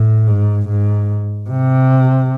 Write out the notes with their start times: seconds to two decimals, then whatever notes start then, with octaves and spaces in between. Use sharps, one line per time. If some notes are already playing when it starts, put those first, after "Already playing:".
Already playing: A2
0.28 G#2
0.68 G#2
1.50 C3